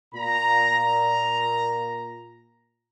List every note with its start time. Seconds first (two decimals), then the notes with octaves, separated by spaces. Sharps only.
0.14 A#2 A#5